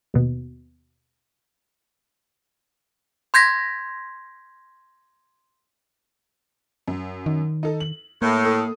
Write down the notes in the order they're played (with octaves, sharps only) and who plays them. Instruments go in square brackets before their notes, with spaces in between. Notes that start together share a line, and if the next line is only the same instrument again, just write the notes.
[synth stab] D#2 B2
[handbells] C6 G6 G#6 A#6 B6
[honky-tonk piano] F#2
[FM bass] D#3
[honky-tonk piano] D#4 A4
F#7
[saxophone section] A2 [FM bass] A#3
[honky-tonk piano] A4 D#6